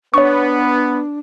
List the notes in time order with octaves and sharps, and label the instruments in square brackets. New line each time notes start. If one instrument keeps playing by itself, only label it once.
[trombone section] B3 [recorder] D4 [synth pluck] C#5 C#6